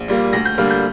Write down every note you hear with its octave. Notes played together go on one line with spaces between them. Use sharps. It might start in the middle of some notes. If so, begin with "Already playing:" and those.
Already playing: A#1
A#2 G3 A#3
D2 A#6
G6
D3 G3 A#3 F6
G6